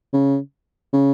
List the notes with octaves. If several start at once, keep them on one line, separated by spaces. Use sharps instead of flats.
C#3
C#3